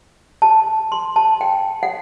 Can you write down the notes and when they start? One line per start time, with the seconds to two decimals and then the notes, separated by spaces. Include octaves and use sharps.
0.42 A5
0.92 C6
1.16 A5
1.41 G5
1.83 F#5